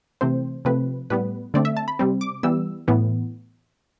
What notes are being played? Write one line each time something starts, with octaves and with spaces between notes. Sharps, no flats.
C3 E3 A3 C4 C5
C3 F3 A3 C4 B4
A2 G3 B3 B4
D3 A3 C4 D5
E5
A5
B5
C3 G3 C4
D6
E3 G3 B3 E6
A2 E3 B3